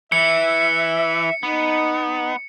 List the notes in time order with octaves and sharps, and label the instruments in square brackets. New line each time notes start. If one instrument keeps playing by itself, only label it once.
[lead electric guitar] E3 [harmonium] E5 [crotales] C#7
[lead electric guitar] B3 [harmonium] D#4